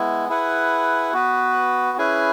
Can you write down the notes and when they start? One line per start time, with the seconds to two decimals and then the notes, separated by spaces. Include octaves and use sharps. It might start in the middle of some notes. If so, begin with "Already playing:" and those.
Already playing: G#3 B3 E4
0.29 E4 G#4 B4 F#5
1.13 B3 F#4 B4
1.98 C#4 E4 G#4 B4 G#5